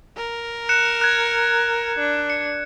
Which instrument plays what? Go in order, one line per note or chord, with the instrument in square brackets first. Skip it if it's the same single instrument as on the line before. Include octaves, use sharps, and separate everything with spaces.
[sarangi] A#4
[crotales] F#6 C#7 E7
F#6 G#6
[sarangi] D4
[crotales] C#7